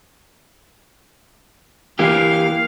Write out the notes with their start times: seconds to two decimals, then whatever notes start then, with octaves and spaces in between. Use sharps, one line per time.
1.99 E3 A#3 G4 F5